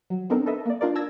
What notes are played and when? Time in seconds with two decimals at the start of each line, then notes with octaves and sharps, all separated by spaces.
0.10 F#3
0.30 B3 C4 D4 D#4 A4 A#4
0.46 A4 B4 D#5 E5
0.66 A#3 D5
0.81 D4 D#4 F4 A#4 D5
0.95 A5 E6 G#6 A#6